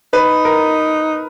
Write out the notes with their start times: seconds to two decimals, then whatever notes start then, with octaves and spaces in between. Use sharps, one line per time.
0.13 D#4 B4
0.45 A#4